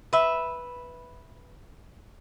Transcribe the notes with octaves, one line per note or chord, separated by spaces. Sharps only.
B4 E5